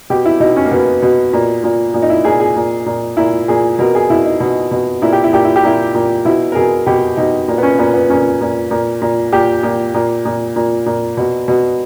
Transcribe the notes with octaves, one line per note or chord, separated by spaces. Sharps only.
B2 G4
E4
B2 D#4
C#4
A#3
B2 B3
B2
A#2
A#2
A#2
D#4
E4
A#2 G#4
G#4
A#2
A#2
A#2 E4
A#2 G#4
B2 A#4
G#4
B2 E4
D#4
B2
B2
A#2 E4
G4
E4
A#2 G4
E4
G4
A#2 E4
A#2
B2 E4
A#4
B2 G#4
B2 G4
B2 D#4
A#2
B3
C#4
A#2 B3
B3
A#2 C#4
A#2
A#2
A#2
A#2 G4
A#2
A#2
A#2
A#2
A#2
B2
B2